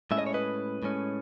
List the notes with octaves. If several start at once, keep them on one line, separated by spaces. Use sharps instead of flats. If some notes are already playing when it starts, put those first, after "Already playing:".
A2 G#3 C#4 E5
D#5
C#5
B4 D#5
A2 G#3 C#4